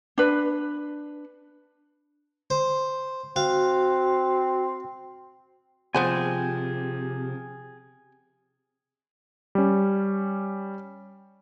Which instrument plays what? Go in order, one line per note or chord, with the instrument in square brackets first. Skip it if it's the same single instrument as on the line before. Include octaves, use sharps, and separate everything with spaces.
[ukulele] D4 B4
[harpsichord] C5
[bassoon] C4 [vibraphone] F#4 [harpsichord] F5
[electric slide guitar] C3 [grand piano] F3 [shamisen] B3 C5 B5 [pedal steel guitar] G#4 G5 G#5
[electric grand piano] G3 C#4